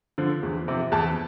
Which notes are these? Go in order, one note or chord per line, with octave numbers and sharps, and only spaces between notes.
D3 F3
E2
C3 F3
E2 A5